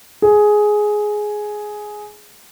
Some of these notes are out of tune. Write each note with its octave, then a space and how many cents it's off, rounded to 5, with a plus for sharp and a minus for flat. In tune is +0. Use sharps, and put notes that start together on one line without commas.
G#4 +10